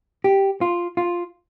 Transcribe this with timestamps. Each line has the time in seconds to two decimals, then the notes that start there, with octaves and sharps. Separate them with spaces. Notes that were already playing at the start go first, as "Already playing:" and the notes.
0.24 G4
0.61 F4
0.97 F4